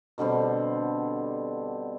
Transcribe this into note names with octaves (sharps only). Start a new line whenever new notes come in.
B2 D3 G3 C4